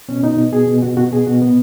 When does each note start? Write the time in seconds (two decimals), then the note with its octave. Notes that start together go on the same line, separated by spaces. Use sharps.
0.08 B2 C#4
0.23 B2 D#4
0.37 B2
0.53 B2 G#4
0.67 B2
0.82 B2 F#4
0.97 B2 F#4
1.12 B2 G#4
1.27 B2 F#4
1.42 A#2 B3